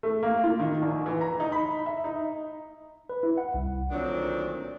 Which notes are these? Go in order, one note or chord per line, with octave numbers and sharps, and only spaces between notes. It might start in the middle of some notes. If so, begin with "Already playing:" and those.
A3
A#3
F4
D#3
A#1
E3
A#5
D#4
B5
E5
D#4
B4
E4
F#5
C2
D2 A#2 D#3 F#3 C4 D4